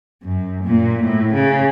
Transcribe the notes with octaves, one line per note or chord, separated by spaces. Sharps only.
F#2
A#2
A2
C#3